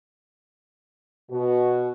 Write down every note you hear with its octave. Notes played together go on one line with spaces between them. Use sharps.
B2 F#4